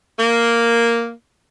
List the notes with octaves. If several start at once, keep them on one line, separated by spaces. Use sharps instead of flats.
A#3